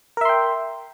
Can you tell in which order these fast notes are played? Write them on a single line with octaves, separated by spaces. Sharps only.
A#4 E5 C6 G5